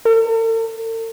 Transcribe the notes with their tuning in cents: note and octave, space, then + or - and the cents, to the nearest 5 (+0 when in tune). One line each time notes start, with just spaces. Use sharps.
A4 +45